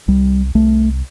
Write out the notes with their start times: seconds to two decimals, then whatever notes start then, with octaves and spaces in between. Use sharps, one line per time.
0.08 C2 G3
0.55 C2 A3